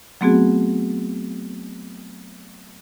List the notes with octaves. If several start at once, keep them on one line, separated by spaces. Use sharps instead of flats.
F#3 A3 B3 C4 F#4 G#4